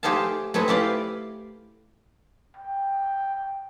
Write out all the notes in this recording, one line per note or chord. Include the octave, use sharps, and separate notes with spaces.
A3 G4 G#4 C5 F5 A5
A3 C4 G#4 B4
E4 G4 B4 D5 F5
G5